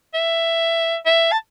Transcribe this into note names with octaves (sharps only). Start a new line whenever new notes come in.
E5
E5
A5